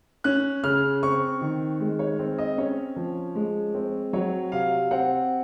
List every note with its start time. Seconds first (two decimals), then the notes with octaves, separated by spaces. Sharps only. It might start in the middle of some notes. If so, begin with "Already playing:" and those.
0.24 C#4 F#6
0.63 C#3 F6
1.03 C4 C#6
1.41 D#3
1.80 G#3
1.99 C#5
2.19 C4
2.38 D#5
2.58 C#4 C#5
2.96 F3
3.35 G#3
3.75 C4
4.13 F#3 C#5
4.52 C3 F5
4.91 C4 F#5